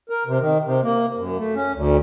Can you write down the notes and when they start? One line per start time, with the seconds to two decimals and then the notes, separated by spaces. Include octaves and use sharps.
0.09 A#4
0.26 C3
0.40 D#3
0.65 C3
0.82 A#3
1.16 F#2
1.37 A3
1.55 C#4
1.74 D2